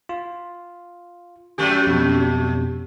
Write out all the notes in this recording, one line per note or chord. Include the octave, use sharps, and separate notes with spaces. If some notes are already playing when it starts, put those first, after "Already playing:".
F4
F#2 A3 G4
F2 B2